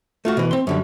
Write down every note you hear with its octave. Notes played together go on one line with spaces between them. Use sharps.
A3 F4 F#4
B2 E3
C4 C6
F#2 D3 G3